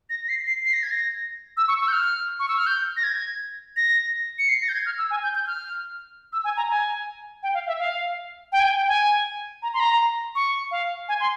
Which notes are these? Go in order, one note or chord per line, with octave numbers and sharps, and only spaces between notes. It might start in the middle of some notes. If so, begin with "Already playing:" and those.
A#6
A#6
C7
C7
C7
A#6
G#6
A#6
E6
C#6
E6
G6
F6
C#6
E6
F6
G6
A#6
G#6
A#6
C#7
C7
A#6
G6
G#6
F6
E6
G#5
G6
G6
F6
E6
G#5
A#5
G#5
G5
F5
E5
F5
G5
G#5
G5
G5
G#5
A#5
C6
A#5
C#6
F5
G#5
C6